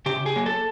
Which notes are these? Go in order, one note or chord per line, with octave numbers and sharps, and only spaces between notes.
C#3 G4
G#4
F#3 A#3
A4